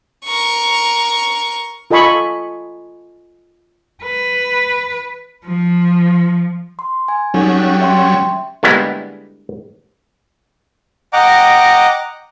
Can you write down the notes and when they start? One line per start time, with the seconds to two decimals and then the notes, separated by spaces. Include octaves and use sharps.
0.25 A#4 C#6
1.91 F4 A4 D#5 G#5 B5 C#6
4.03 B4
5.46 F3
6.79 C6
7.08 G#5
7.34 F#3 G3 C#4 D#4 A4
7.59 G5 F#6
7.81 E5 G5 C6
8.63 D3 G3 G#3 A#3 B3 E4
11.13 D#5 F#5 G5 A#5 D6